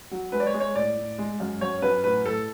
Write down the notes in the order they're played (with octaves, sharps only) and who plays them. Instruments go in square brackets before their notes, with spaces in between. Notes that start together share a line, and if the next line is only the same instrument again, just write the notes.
[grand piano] F#3
G#3 B4
D5
C#5
G#3
C#5
A2 D5
A2
G#3
F#2
F#2 C#5
F#2 B4
A2 B4
A2 A4